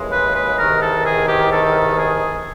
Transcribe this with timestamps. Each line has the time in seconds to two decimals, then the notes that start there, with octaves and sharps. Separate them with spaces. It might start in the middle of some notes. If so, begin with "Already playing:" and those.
Already playing: D#2 C#3 E3 G#3
0.12 B4
0.35 B4
0.58 E2 C3 D#3 A#4
0.82 A4
1.06 G#4
1.28 G4
1.52 A4
1.99 G#4